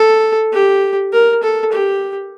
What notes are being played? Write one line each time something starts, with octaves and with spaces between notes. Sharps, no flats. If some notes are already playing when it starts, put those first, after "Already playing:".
Already playing: A4
G4
A#4
A4
G4